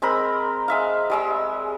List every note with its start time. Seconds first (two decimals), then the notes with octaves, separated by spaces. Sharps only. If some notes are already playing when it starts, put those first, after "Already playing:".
0.02 G#3 C4 A#4 B5
0.68 G#3 E5 F5
1.10 G3 G#3 E6